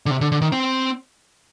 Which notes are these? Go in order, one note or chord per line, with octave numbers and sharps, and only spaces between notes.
D3
C3
D3
D3
D#3
C4